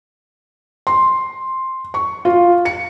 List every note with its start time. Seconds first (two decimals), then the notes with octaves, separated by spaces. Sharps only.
0.87 C6
1.94 C#6
2.25 F4
2.65 C#7